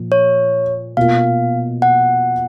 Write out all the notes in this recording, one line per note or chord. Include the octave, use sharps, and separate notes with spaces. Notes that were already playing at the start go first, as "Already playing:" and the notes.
Already playing: A#2 F3
C#5
B2 A#3 F4 F5
F#5